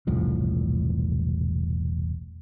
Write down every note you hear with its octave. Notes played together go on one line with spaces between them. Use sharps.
E1 C2 A2 F3